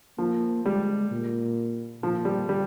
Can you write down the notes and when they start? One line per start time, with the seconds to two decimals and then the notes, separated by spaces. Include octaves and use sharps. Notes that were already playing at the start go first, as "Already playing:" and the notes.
0.18 F3 A#3
0.65 G3 G#3
1.11 A#2
2.03 A#2 F3
2.25 G3
2.49 G3